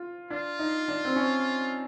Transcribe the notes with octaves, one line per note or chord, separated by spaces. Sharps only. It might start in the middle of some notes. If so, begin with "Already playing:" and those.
Already playing: F4
D4 F4
D#4
D4
C4
C#4